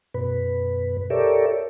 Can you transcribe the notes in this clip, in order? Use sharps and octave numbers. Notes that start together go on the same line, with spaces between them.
F#2 B2 B4
G4 A4 A#4 C#5 D5 E5